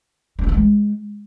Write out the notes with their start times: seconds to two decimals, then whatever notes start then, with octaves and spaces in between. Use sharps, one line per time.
0.39 D4
0.44 E4
0.49 E3
0.54 G#3